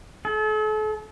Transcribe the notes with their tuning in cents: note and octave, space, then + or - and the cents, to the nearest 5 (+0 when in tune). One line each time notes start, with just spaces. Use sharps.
A4 -40